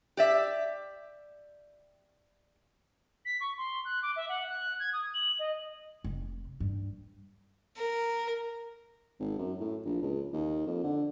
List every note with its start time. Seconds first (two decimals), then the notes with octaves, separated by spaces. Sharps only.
0.17 G4 D5 E5
3.25 B6
3.40 C#6
3.57 C6
3.85 F#6
4.02 D6
4.16 E5
4.29 F#5
4.49 F#6
4.79 G#6
4.93 D#6
5.14 F#7
5.39 D#5
6.04 F1
6.60 G2
7.77 A#4
9.20 G#1
9.38 F#2
9.60 A2
9.85 A#1
10.02 C#2
10.33 D#2
10.66 F2
10.84 D3